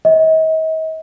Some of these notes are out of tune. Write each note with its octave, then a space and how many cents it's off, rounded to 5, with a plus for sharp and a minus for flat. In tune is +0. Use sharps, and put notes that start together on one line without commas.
D#5 +40